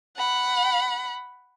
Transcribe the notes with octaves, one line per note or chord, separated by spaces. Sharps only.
F#5 B5